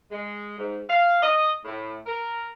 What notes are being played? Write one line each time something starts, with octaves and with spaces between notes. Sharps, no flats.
G#3
G#2
F5
D#5
A2
A#4